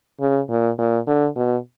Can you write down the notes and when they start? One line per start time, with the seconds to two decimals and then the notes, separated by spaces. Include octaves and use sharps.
0.21 C#3
0.50 A#2
0.78 A#2
1.07 D3
1.36 B2